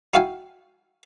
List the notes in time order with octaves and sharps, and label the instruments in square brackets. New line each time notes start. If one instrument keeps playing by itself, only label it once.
[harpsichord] D#4 E4 F#4 F5 G5 G#5